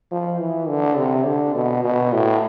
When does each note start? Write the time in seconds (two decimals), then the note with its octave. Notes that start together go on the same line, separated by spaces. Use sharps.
0.11 F3
0.40 E3
0.69 D3
0.97 C3
1.26 D3
1.55 B2
1.84 B2
2.13 A2